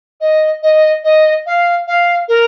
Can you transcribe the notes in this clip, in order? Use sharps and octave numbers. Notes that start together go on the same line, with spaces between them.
D#5
D#5
D#5
F5
F5
A#4